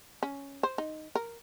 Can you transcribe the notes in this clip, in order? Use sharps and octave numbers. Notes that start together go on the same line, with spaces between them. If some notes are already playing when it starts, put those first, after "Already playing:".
C#4
C5
D#4
A#4